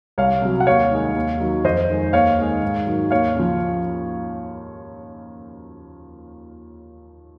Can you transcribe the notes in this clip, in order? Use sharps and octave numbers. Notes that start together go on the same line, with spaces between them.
C2 C#5 F5
C3 F#3
F#5
D#2 C#5 F5
D#3 G#3
D#2
D#3 F#3
F2 C5 D#5
D#3 G#3
D#2 C#5 F5
D#3 G#3
G#2
D#3 F#3
D#2 C#5 F5
C#3 F3